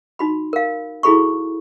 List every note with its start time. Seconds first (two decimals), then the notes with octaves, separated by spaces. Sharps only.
0.19 D#4 F#4 B5
0.53 A#4 F5
1.03 E4 F#4 G#4 A4 B5 C#6